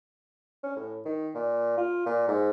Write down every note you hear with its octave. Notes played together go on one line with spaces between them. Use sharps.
C#4
A2
D#3
A#2
F4
A#2
G#2